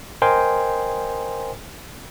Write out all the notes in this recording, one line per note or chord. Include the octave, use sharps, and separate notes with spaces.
A#4 C5 D#5 G5 G#5 C6